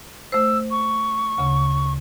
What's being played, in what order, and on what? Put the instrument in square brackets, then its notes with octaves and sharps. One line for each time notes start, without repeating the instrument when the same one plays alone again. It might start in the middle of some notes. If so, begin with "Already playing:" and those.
[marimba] A3 C5 [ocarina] E6
[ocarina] C#6
[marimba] D2 C#3